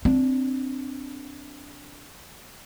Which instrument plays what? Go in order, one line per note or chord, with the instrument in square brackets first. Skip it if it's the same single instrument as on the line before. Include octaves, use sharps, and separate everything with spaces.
[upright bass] C4 D4